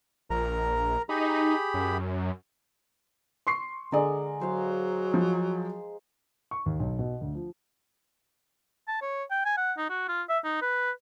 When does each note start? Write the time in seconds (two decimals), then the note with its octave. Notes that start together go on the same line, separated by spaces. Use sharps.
0.30 A#1 A#4 A#5
1.09 D#4 G4 G#4 B5
1.74 F#2
3.47 C6 C#6 C7
3.92 D3 G#3 A#4 D5
4.41 F#3 C5 F5
5.14 F3
6.51 C#6
6.66 D#2
6.80 B1
6.99 B2
7.21 D2
7.35 F3
8.88 A5
9.02 C#5
9.31 G5
9.45 G#5
9.57 F#5
9.77 D#4
9.90 F#4
10.08 F4
10.29 E5
10.44 D#4
10.62 B4